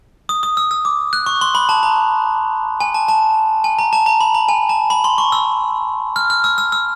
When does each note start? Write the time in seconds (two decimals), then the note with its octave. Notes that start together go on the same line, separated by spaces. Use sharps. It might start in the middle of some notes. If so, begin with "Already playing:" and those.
0.29 D#6
0.43 D#6
0.57 E6
0.71 E6
0.85 D6
1.13 F#6
1.26 C#6
1.41 C6
1.55 B5
1.69 A5
1.83 A#5
2.80 G#5
2.94 A5
3.08 A5
3.64 G#5
3.79 A#5
3.93 A5
4.06 A#5
4.20 B5
4.34 A#5
4.48 G#5
4.69 A5
4.90 B5
5.04 C6
5.18 C#6
5.32 E6
6.16 F6
6.30 F6
6.44 E6
6.58 E6
6.72 E6